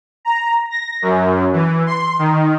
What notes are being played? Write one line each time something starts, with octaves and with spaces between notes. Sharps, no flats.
A#5
A#6
F#2
E3
C6
D#3